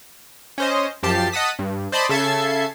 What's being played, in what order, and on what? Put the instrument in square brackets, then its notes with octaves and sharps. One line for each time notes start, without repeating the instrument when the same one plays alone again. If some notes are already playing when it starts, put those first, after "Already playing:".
[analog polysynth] C#4 C5 D#5
F#2 F3 G4 A5 C7
D#5 F#5 A5 D#6 B6
G2
C5 D5 D#5 A5 B5 C6
C#3 A4 E5 A5 G#6 C7